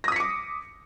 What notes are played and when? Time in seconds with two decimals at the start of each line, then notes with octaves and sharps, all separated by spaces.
0.04 A#6
0.08 D#6
0.12 B6
0.16 C#7
0.20 D6